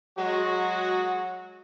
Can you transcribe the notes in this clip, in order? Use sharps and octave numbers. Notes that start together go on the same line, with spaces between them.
F#3 G#3 F#4